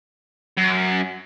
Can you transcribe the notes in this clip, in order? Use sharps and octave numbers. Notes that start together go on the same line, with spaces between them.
F#2